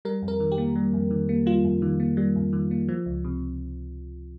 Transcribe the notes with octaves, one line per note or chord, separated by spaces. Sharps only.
G3 A#4
F2
A#4
D#3
G4
A#3
G3
F2
D#3
A#3
G3 F4
F2
D#3
A#3
G3
F2
D#3
A#3
F3
C#2
C3